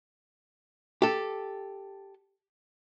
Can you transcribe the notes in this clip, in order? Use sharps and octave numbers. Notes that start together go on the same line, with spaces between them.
G4 A4